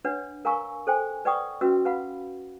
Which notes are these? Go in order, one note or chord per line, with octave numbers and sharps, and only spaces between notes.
D4 B4 C#5 F#5
A#4 F5 G#5 A#5 C#6 E6
A4 C5 G5 G#5
B4 D5 F#5 G5 C#6 D#6
C#4 F#4 B4 E5 E6
B4 F5 F#5 B5